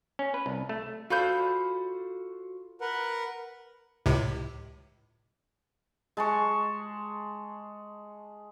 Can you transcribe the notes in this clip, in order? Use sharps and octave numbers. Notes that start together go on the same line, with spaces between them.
C#4
B4
C2
A3
F4 F#4 A4 C5 B5 G6
A#4 B4 F#5
C#2 A2 C3
G#3 A5 C#6